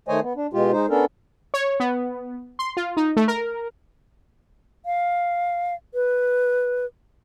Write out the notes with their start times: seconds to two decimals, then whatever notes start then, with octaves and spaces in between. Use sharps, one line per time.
0.08 D#3 A3 C5 C#5 D#5 G#5
0.22 B3
0.36 D4
0.53 B2 G#3 F4 G4
0.72 G#3 D#4 C5
0.90 B3 C#4 D4 A4 A#4
1.54 C#5
1.80 B3
2.59 C6
2.77 F4
2.97 D#4
3.17 A3
3.28 A#4
4.86 F5
5.94 B4